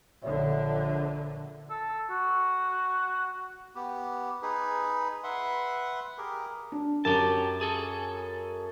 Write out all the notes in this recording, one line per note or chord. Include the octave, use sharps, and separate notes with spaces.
A#1 D3 C#5 D5 E5
A4
F#4
B3 G4
D#4 G#4 B4
B4 E5 F#5 C6
G4 G#4 A#4
D4
F#2 G4 A5
G#4 A4